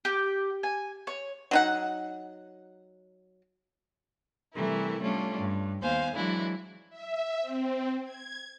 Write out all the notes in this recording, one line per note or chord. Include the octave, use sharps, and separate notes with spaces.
G4
G#5
C#5
F#3 D#4 F#5
C3 E3 G3 A3 E4 A#4
G3 A3 C#4 D4 F4
G2
D#2 B3 C5 F5 G#5
E3 F#3 G#3 D4 E4
E5
C4
G#6